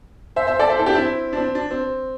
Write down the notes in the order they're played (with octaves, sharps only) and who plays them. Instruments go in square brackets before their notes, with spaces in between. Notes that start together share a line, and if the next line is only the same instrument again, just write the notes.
[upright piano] C5 E5
C5 E5
A4 D5
C5 E5
E4 A4
D4 G4
C4 E4
D4
C4
D4
C4